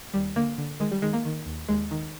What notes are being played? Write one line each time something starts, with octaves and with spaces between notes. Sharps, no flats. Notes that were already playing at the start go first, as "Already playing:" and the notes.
D#2 G3
D3 A#3
D3
D#3 G#3
G3
D#3 G#3
A#3
D#3
D#2
D#2 G#3
D#3